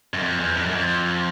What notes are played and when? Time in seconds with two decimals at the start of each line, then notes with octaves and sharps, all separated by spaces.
0.14 F#2
0.22 F2
0.40 E2
0.57 F2
0.66 F#2
0.75 F2